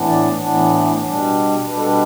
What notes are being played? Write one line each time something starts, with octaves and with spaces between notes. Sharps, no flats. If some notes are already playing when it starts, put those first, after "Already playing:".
Already playing: A2 E3 B3 D4
D5
A2 E3 B3 D4
B2 G3 D4
B2 G3 D4 B4
A4
B4